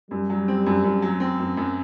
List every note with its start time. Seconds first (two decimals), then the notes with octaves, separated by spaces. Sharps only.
0.11 F#2 G3
0.30 F#3
0.48 C4
0.66 F#2
0.84 F#2
1.02 F#3
1.20 C4
1.39 F#2
1.57 F#2